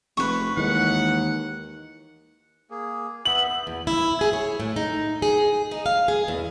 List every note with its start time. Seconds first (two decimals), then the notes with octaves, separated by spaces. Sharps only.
0.17 F1 B4 C#6
0.57 D#2 E3 G#3 F#5
2.70 A#3 G#4
3.25 B3 E5 F#7
3.67 E2
3.87 E4
4.21 G#4
4.33 C#5
4.60 A2
4.76 D#4
5.22 G#4
5.71 D#4
5.86 F5
6.08 G#4
6.28 E2